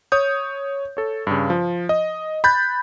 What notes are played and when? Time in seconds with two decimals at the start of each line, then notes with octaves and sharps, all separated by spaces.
0.12 C#5 D#6 G6
0.97 A4 C#5
1.27 G2 C#3
1.50 F3
1.89 D#5
2.44 B5 F#6 G6 A6